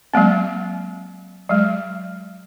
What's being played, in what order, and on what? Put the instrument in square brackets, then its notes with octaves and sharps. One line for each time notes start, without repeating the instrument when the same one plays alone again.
[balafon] F#3 G#3 A#3 C4
F#3 G#3